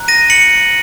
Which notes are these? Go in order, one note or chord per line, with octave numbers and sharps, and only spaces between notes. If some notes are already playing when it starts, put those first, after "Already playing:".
Already playing: A#5 F#6
A#6 D#7
C#7 F#7